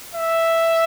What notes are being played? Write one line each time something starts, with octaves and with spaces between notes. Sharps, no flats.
E5